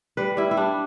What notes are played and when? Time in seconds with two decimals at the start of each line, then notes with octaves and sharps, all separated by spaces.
0.17 G3 B4
0.37 G3 E4
0.51 E4
0.57 G3 D4